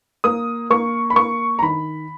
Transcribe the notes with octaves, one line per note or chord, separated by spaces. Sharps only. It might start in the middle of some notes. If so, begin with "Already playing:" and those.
A#3 D#6
A#3 C#6
B5
A#3 C#6
A#5
D#3 B5